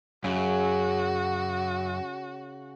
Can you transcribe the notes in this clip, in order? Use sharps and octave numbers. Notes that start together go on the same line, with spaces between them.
F#2 C#3 F#4